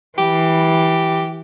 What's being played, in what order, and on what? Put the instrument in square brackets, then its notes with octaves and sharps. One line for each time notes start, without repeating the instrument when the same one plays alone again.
[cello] E3 [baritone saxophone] G4